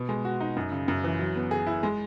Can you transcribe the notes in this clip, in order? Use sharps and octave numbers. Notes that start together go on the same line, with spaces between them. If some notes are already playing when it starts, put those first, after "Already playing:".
Already playing: B2
G#3
F#4
D#4
F#2
C#3
F#2
E3
F#3
B3
G#4
E4
G#3